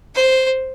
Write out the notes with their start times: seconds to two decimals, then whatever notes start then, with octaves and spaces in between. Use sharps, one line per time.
0.15 C5